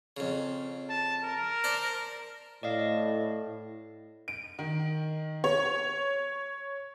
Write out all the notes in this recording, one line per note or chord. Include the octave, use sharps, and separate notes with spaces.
F2 C#3
A5
A#4
C5 D5 A5
A2 D5 D#5 F5
D7
D#3
C#5